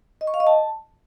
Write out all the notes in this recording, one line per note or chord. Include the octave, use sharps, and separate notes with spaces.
D#5
C#6
F5
D#5
A5